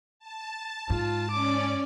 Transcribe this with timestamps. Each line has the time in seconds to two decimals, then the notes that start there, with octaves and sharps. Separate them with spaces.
0.19 A5
0.90 G#2 F4
1.31 C#4 D5 D6